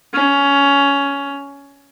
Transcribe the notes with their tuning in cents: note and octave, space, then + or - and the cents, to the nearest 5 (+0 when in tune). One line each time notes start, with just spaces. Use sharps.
C#4 +15